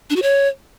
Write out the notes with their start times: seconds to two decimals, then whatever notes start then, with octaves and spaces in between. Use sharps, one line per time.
0.10 D4
0.16 F#4
0.22 C#5